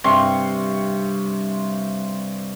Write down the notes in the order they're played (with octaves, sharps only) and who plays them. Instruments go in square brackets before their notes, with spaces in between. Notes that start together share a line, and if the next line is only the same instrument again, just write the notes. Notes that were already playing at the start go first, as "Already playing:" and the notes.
[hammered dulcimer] G2 C3 C6 C#6